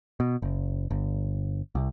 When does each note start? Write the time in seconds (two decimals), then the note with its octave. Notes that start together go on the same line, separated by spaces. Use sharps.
0.20 B2
0.42 F#1
0.90 G1
1.75 C2